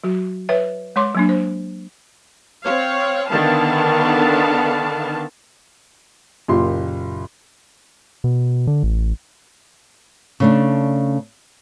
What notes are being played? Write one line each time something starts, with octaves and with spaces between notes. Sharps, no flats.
F#3 F#4
B4 C#5 E5
G#3 C#5 C6 D6
F#3 A#3 D4
C5
C4 C#5 F5
D3 D#3 B3 F5 A5
F#1 A#2 G4 C6
B2
D3
A1
C#3 A3 D4